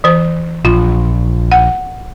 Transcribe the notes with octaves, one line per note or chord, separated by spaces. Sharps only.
E3 C5
A#1 F4
F#5